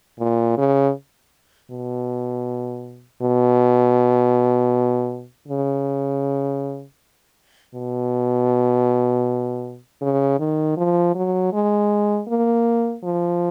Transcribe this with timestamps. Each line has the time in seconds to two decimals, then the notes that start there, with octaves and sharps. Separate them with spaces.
0.19 A#2
0.57 C#3
1.71 B2
3.22 B2
5.48 C#3
7.74 B2
10.01 C#3
10.39 D#3
10.77 F3
11.15 F#3
11.53 G#3
12.28 A#3
13.03 F3